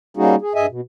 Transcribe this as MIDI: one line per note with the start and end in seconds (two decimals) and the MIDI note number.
0.17 0.35 55
0.17 0.35 58
0.17 0.35 61
0.17 0.35 63
0.17 0.35 66
0.17 0.35 68
0.41 0.53 68
0.55 0.66 43
0.55 0.66 68
0.55 0.66 75
0.55 0.66 76
0.55 0.66 80
0.69 0.81 47